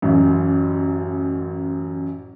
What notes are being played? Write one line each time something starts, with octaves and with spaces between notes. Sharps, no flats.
A1 F#2